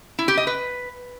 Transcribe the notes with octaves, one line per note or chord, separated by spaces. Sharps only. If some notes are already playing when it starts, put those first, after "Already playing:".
E4
G4
D#5
B4